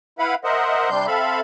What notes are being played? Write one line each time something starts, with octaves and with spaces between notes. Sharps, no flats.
E4 B4 F5 F#5 B5
A#4 C5 D#5 E5 F#5
C3 G3 D4 C6 G6
C4 A4 E5 F5 B5